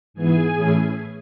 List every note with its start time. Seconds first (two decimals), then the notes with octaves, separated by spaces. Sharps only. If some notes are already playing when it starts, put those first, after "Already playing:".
0.14 G#2 E3 B3 E4 G#4 G#5
0.55 A2 E3 A3 C#4 E4